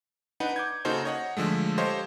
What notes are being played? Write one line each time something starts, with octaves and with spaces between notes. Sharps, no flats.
D4 D#4 B4 F#5
D6 G6 G#6
C#3 A#3 D#4 F#4 A4 C5
C#5 D#5 F#5
D3 F3 G#3 A3
G4 A4 C5 C#5 D#5 F5